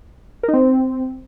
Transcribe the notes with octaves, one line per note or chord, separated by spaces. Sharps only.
A#4
D#4
C4